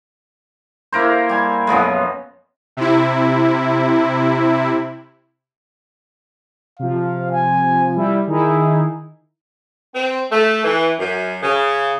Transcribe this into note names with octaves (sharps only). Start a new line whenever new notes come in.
A#3 E4 A#4 C5
G3 G#5
F#2 B2 F3 G#3
C3 E4
C3 F3 F5
G#5
G3 E4
D#3 D#4 E4 G#4
C4
A3
E3
F#2
C#3